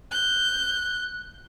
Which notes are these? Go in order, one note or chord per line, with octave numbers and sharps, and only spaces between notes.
F#6 G6